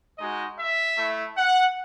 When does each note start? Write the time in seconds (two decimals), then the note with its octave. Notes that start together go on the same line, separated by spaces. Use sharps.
0.18 G#3 D#4 F#4 D#5
0.58 E5
0.98 A3 E4
1.37 F#5